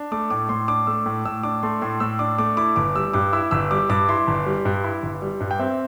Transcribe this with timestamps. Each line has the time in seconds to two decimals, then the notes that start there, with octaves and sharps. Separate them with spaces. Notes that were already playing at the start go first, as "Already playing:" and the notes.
Already playing: D4
0.11 A3 D6
0.30 A2 D6
0.49 A2 C6
0.68 D4 D6
0.87 A3 E6
1.06 A2
1.25 A2 E6
1.43 D4 D6
1.63 A3 C6
1.81 A2 C6
2.00 A2 E6
2.19 D4 D6
2.38 A3 D6
2.57 E4 D6
2.76 G1 D6
2.95 G3 E6
3.13 G2 D6
3.33 E4 E6
3.51 G1 E6
3.71 G3 D6
3.89 G2 D6
4.09 E4 C6
4.28 G1
4.46 G3
4.65 G2
4.84 E4
5.03 G1
5.22 G3
5.40 G2
5.51 G5
5.59 C4 E5